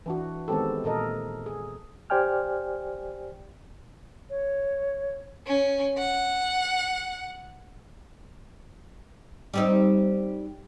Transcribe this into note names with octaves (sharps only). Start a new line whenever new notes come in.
E3 D4 F#4
D#3 G#3 B3 C4 G4 A4
A#2 A4 A#4 D#5
G#4
G4 C5 D5 G5 G#5 F6
C#5
C#4
F#5
G3 C4 D#4